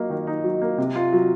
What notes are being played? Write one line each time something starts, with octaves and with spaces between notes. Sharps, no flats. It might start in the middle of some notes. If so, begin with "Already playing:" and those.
Already playing: F#3 A#3 D#4
D#3
D#4
F#3
A#3
C3
F4
F#3